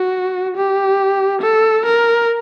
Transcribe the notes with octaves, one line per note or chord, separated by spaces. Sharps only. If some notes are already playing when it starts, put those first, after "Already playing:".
Already playing: F#4
G4
A4
A#4